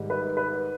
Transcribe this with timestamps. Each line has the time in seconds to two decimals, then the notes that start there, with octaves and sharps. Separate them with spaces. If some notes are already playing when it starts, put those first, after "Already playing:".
Already playing: G#2 D#3 G3
0.10 B4
0.37 B4